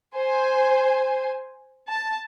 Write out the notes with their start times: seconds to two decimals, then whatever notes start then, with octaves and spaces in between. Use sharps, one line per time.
0.15 C5 G#5
1.89 A5